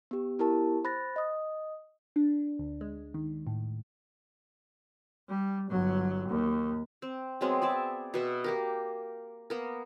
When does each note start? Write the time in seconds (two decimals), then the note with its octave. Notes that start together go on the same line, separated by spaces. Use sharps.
0.11 B3 G4
0.39 B3 E4 G4 A#4 A5
0.84 C5 B5 F#6 A6 A#6
1.16 D#5 D#6
2.16 D4
2.59 D2
2.81 G#3
3.14 D#3
3.47 A2
5.28 G3
5.69 G1 F#3
6.28 D#2
7.02 C4
7.41 F#3 G#3 B3 C4
7.62 G#4 D5 E5 A5
8.14 B2 B4 E5
8.44 A#3 G4 A#4
9.50 A#3 B3 A#4